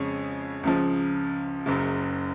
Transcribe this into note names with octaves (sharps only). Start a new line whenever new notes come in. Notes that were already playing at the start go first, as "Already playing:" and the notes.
Already playing: F2 C#3 G#3 C#4 G#4
C#2 C#3 F3
F#1 F#2 C#3